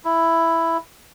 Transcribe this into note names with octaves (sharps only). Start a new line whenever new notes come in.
E4